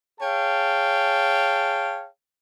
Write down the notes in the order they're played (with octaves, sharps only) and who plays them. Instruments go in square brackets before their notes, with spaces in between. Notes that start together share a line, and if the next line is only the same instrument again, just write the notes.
[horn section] G#4 C#5 F5 G5 A5